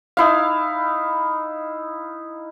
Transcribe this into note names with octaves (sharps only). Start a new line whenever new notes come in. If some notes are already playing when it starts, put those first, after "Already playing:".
D#4 E4 F5